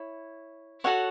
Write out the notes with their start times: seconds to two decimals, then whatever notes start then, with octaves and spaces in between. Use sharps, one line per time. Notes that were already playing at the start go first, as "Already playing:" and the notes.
Already playing: E4 C#5
0.84 F#4 A4 C#5 F#5